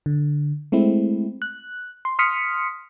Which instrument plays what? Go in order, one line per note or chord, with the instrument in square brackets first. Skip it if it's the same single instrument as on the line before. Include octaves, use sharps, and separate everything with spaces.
[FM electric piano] D3
G#3 A3 C4 E4
F#6
C6
C6 D#6 F6 B6 C#7